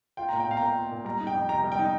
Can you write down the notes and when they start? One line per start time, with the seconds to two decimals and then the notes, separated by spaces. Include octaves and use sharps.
0.17 F4 G5
0.29 A#2 A#5
0.40 G5
0.47 A#2 F5
0.57 A#5
0.62 A#3 G5
0.76 F4
0.91 A#2
1.05 G3 A#5
1.21 D#4
1.27 G5
1.35 F2
1.49 C3 A#5
1.64 G3
1.72 G5
1.79 D#4